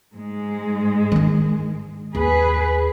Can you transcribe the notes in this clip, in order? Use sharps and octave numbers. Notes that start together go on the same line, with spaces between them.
G#2 G#3
D#3 D4
D#2 G#4 B4